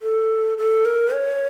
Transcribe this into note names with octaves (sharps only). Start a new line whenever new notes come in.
A4
A4
A#4
C#5